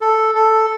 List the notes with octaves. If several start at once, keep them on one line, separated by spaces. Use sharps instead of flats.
A4
A4